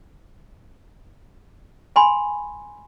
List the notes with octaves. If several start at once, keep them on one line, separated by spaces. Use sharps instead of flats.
G#5 B5 C6